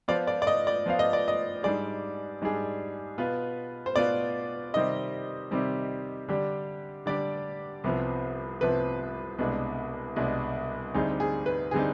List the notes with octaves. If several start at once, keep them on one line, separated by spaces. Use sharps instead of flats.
F3 B3 F4 C5 D5 F5
D5
D5
D#5
D5
F3 B3 F4 C5 F5
D#5
D5
D#5
G#2 G3 D4 G#4 D5
G#2 G3 D4 G#4
B2 B3 F4 B4
C5
B2 B3 F4 B4 D5
C3 D#3 G3 C4 D#5
C3 D#3 G3 C4
D3 G3 D4 G4
D3 G3 D4 G4 D5
C2 C3 F3 B3
C2 C3 F3 B3 B4
C2 B2 G#3 B3 D4
C2 B2 G#3 B3 D4
D2 D3 G3 C4 D#4 G#4
G#4
B4
D3 G3 C4 D#4 G#4